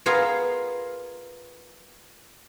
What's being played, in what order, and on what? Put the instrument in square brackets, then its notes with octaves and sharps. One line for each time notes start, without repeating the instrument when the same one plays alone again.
[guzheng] B3 F4 G#4 A#4 F5